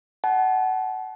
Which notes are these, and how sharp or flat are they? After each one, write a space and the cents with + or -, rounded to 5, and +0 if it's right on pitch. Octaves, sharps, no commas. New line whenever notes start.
F#5 +20 A5 -35